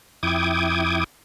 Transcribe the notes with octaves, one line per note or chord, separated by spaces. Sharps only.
F2 E4 G5 D6 D#6 G#6